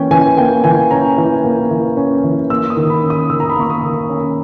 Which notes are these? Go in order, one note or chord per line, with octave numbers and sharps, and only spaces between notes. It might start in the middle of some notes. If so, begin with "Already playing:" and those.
Already playing: E3 A#3 C#4 G5
E3 G#5
A#3 G5
E3 G#5
C#4 A#5
E3
A#3
E3
C#4
E3
A#3 E6
D#6
D#3
B5
C#4
D#6
D#3 E6
A#5
B5
A#3 C#6
D#6
D#3
C#4